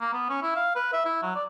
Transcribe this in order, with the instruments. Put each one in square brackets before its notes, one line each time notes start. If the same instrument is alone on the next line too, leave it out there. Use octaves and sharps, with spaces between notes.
[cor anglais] A#3
B3
C#4
E4
F5
B4
E5
E4
F#3
D5